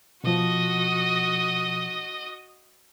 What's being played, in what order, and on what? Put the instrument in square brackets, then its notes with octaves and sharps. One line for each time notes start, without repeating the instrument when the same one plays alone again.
[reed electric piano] B2 F3 [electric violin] F#4 D#5